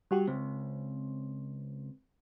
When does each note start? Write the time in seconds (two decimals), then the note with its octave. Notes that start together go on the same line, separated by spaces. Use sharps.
0.11 G3 F#4 G4
0.28 C#2 C4